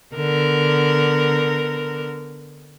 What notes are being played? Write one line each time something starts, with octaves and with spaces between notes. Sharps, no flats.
D3 B3 A#4